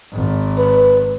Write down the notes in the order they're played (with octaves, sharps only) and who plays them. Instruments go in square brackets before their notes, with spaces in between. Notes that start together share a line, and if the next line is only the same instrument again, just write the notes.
[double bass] G#1
[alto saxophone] B4